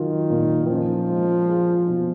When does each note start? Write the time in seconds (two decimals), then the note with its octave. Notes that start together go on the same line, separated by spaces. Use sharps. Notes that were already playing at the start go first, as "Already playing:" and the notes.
Already playing: D#3 F#3 F4
0.30 A#2
0.69 F3 C#4
1.09 G#3
1.48 G#4
1.87 B2